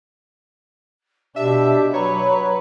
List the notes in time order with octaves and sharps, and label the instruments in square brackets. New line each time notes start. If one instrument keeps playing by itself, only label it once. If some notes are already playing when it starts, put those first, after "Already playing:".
[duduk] B2 [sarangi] D4 [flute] G4 [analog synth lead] E5
[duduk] F#3 [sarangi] B4 [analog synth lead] C#5 [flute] A#5